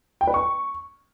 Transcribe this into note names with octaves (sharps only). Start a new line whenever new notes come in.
G5
B4
C#6